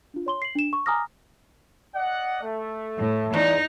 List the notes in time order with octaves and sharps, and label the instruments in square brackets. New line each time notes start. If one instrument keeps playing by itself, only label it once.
[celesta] D4 F4
C#5 C6 G7
C7 F#7
D4 E7
C#6
G#5 A#5 D6 D#6 F6 A#6
[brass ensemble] D5 D#5 F#5
A3
[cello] A2
[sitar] E2 [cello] D#4